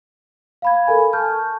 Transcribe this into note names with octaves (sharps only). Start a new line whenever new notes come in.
F5 B5 G#6
A4 A#4 G#5
A5 C#6 F6 G6